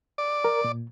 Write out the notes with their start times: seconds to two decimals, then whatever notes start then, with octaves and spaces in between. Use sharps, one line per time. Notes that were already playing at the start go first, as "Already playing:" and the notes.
0.18 D5
0.45 A#4
0.64 A#2